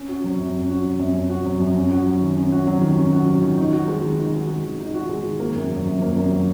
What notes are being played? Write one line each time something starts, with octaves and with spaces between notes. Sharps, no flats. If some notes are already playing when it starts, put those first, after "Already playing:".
Already playing: C#4
F#4
F#3
F#2
C#4
F#4
F#3
F#2
C#4
F#4
F#3
F#2
C#4
F#4
F#3
D#3
C#4
F#4
F#3
D#3
C#4
F#4
F#3
D#3
D#4
F#4
G#3
D#3
D#4
F#4
G#3
D#3
D#4
F#4
G#3
D#3
A#3
F#2
F#3
F#2
A#3
F#2
F#3